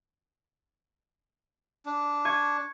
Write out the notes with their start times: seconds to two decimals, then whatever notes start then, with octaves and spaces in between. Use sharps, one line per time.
1.86 D4
2.25 C#6 G#6 D#7